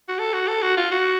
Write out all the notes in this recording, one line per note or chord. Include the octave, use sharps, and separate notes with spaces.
F#4
A4
F#4
A4
F#4
F4
F#4